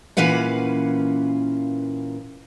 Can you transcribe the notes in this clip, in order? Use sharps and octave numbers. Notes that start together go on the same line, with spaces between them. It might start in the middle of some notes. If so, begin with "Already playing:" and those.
A#2 E3 C#4 B4 F5 F#5